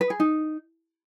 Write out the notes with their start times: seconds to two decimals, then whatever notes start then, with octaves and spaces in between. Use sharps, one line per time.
0.01 B4
0.10 G#4
0.20 D#4